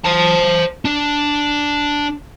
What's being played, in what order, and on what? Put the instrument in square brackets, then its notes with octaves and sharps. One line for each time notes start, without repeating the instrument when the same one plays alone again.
[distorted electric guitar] C5 A5
D4